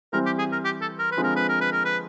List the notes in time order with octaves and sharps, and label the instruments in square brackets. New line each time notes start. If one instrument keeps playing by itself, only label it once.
[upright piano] E3 G3 C4 [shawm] A#4
[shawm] G4
G#4
A#4
G4
A4
A#4
B4
[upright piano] D3 F3 G#3 C4
[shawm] A#4
B4
A#4
B4
A#4
B4